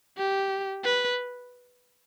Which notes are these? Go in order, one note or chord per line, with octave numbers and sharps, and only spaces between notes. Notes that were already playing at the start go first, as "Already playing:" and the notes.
G4
B4